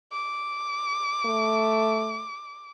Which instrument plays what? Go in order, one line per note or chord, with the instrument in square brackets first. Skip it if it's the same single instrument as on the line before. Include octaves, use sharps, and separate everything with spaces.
[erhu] D6
[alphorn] A3